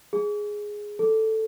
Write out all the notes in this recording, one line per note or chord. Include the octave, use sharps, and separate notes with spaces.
G#4
A4